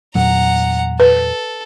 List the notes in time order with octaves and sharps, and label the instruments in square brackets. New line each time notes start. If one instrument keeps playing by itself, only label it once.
[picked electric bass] E2 A#2 F#3 [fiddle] F#5 A#5
[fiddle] A4 [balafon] B4